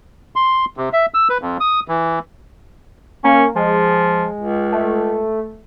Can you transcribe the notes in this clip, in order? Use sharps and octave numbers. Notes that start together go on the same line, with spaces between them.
C6
C3
E5
E6
B4
F2
D#6
E3
A#3 C#4
F3 G#3
C#2
A3